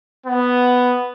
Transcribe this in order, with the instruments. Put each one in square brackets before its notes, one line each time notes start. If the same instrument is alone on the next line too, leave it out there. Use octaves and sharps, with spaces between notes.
[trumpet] B3